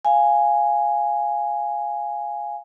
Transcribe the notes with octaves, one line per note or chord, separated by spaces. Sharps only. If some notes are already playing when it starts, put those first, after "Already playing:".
F5 G#5